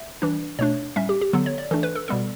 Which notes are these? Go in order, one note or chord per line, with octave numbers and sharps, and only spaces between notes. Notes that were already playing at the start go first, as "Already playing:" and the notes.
Already playing: E5
E3 G3 D4
B2 A3 D4 C#5
A2 G3 C#4 E5
G4
G4
D3 F#3 B3 A4
C#5
D5
E3 A3 D4 A4
B4
A4
B2 G3 B3 A4